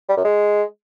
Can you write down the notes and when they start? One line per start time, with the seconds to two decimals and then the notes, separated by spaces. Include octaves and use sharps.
0.09 G3
0.17 F#2
0.25 G#3